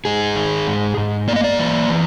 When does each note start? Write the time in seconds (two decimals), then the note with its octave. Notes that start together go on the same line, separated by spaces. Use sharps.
0.05 G#2 G#4
0.36 D#3
0.67 G#2
0.97 G#2
1.28 A#3 D5
1.36 D#5
1.44 D5
1.59 E3
1.89 E3